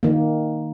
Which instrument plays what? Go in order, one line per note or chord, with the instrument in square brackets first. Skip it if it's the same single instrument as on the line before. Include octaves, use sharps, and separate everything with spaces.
[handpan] D#3 A#3